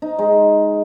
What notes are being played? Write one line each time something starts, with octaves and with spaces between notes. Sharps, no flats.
D#4
G#3